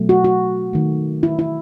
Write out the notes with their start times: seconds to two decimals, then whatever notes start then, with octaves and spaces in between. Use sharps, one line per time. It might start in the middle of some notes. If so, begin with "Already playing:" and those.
Already playing: B2 F#3 A3
0.09 F#4
0.24 F#4
0.73 D#3 A3
1.23 E4
1.39 E4